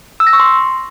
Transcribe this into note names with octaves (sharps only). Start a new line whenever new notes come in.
E6
A#6
C#6
C6